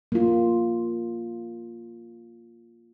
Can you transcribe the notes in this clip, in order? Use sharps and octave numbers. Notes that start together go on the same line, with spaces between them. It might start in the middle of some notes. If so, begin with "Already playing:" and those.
A#3 F4